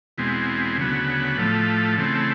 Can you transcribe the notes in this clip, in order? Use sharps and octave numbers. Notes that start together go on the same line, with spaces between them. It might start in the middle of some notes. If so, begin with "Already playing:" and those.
E2 B2 G#3 C4
D2 C#3 F#3 B3
A2 F3 A3
C#3 E3 A3 C4